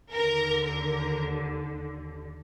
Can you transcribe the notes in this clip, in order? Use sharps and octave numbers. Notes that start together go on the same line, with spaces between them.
D#2 D3 A#4
A#4